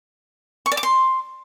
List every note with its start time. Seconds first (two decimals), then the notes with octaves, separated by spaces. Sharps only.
0.66 C#6
0.72 D5
0.77 D6
0.83 C6